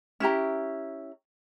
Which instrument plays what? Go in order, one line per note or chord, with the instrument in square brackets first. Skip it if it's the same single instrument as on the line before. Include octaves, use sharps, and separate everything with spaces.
[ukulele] C#4 E4 G4 A#5